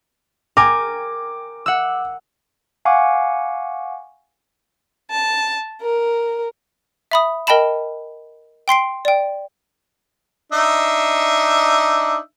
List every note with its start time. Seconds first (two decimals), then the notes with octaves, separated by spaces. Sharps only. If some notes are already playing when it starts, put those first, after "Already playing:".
0.57 A#4 G5 G#5 D6
1.66 F#5 E6
2.85 F5 F#5 G#5 C#6 D6
5.10 A5
5.81 A#4
7.11 E5 B5 D#6
7.47 A#4 D#5 G5 A5 B5 E7
8.68 G5 C6 C7 D7
9.05 D5 G5
10.52 D4 D#4 E5